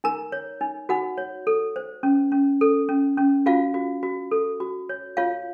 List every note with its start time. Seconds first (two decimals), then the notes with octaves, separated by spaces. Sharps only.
0.04 D#4 A#4 A#5
0.32 C#5
0.61 D#4
0.89 D#4 F#4 F#5
1.18 C#5
1.47 A4
1.76 C5
2.03 C#4
2.32 C#4
2.61 A4
2.89 C#4
3.18 C#4
3.46 F4 F#4 F5
3.74 F#4
4.03 F#4
4.31 A4
4.60 F#4
4.89 C#5
5.17 F4 C#5 F5